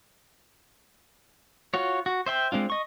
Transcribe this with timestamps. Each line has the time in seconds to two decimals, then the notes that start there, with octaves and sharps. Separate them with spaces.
1.74 F4 F#4 C#5
2.06 F#4
2.26 C5 E5 G5
2.52 G#3 C4 D4 F4
2.70 D#5 C#6